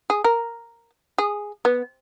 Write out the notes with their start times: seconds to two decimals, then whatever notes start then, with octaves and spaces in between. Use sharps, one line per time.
0.10 G#4
0.24 A#4
1.18 G#4
1.65 B3